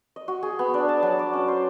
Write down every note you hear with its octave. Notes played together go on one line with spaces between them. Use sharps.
D#5
F#4
G#4
B3
D4
A5
F#3
D5
C#4
C5